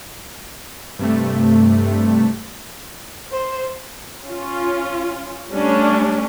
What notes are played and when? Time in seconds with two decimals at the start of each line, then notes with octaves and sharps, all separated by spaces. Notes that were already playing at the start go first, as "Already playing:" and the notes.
0.99 G2 C3 A3
3.32 C5
4.24 C#4 F4
5.50 G3 A3 C#4 D4